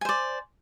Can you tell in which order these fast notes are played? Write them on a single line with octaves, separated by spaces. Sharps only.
G#5 C5 D5